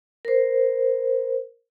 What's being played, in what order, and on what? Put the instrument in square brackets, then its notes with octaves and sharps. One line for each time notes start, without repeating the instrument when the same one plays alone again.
[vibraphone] A#4 C5